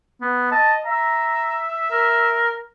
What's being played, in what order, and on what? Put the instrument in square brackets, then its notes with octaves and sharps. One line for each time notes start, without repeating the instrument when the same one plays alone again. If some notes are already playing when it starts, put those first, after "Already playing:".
[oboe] B3
[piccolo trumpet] D#5 [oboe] A5
[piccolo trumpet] E5 [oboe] A#5
[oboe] A#4